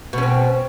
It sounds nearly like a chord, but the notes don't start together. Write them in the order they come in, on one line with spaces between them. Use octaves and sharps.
B2 C#4 C4